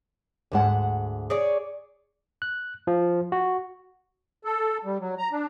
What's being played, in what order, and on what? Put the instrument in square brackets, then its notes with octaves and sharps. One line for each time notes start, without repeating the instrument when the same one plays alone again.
[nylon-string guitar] D2 G#2 F#5
[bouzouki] G#4 C#5 D5
[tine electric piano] F#6
F3
F#4
[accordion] A4
G3
F#3
A#5
D4